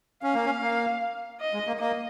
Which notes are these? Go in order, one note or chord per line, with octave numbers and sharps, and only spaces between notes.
C#4 F5
A#3
C#4
A#3
D#5
G#3
A#3
A#3 D#5